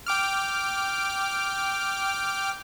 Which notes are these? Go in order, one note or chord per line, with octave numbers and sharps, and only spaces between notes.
G5 D6 F6